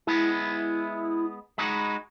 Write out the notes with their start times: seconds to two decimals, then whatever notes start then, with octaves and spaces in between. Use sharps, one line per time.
0.07 G#3 B3 E4
1.58 G#3 D#4 F#4 B5